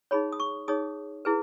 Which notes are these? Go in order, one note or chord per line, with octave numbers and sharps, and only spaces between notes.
D#4 G#4 C#5 B5
D#6
C#6
D#4 G#4 C#5 D#6
E4 G#4 B4